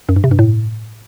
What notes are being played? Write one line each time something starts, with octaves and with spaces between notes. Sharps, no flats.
F#2
G2
C3
G2
A2